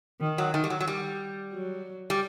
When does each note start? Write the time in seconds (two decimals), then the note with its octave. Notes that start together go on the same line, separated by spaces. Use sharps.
0.20 D#3
0.38 F#3
0.54 D#3
0.64 G3
0.70 F#3
0.80 F#3
0.88 G3
1.54 F#3
2.10 G3